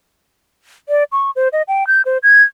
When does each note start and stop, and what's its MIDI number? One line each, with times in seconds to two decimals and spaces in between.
0.89 1.04 74
1.12 1.31 85
1.36 1.48 72
1.53 1.62 75
1.68 1.86 79
1.87 2.02 91
2.05 2.18 72
2.23 2.43 92